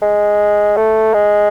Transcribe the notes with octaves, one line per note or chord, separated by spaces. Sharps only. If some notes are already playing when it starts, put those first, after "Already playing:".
G#3
A3
G#3